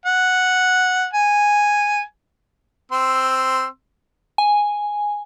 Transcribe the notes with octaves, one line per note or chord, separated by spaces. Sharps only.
F#5
G#5
C4 C6 E6
G#5